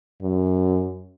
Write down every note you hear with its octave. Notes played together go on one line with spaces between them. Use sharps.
F#2